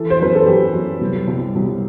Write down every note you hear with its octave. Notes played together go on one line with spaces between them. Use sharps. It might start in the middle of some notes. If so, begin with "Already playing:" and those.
Already playing: E3 A4
C5
F#2 B4
A4
F#2 G4
F#2
C2
C2
C2